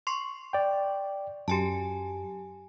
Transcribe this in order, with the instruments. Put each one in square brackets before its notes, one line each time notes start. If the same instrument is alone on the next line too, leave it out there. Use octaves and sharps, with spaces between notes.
[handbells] C6 C#6 C7
[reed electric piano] D5 G5
[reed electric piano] F#2 [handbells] G4 G#5 A5